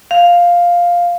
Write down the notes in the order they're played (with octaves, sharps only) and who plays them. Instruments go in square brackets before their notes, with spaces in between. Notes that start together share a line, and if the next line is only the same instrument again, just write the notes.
[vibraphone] F5